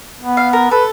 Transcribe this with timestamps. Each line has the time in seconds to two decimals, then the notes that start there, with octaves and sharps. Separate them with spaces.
0.20 B3
0.37 F5
0.53 A#4
0.71 A4 B4